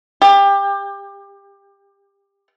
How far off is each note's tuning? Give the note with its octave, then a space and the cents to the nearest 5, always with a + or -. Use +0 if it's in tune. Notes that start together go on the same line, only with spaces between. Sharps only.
G4 +25